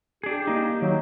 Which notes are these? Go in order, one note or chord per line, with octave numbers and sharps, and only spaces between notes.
D4 G4 G#4
A#3 D#4
D#3 F#3